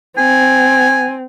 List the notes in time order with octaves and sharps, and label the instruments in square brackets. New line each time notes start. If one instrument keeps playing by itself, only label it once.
[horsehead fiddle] C4 [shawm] G#5